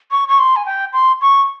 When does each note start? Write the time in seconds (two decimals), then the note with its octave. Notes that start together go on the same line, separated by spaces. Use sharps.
0.11 C#6
0.28 C#6
0.39 C6
0.56 G#5
0.66 G5
0.93 C6
1.21 C#6